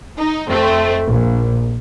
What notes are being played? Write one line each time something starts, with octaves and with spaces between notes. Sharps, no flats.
D#4
F2 A3 C4
A#1